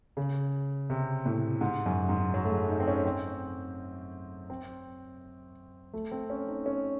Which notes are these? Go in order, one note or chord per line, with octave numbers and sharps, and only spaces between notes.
C#3
C3
A2
G#2
F#2
G#2
F#3
A3
G#3
D#4
C4
C#4
C4
C4
A3
C4
C#4
D#4
C#4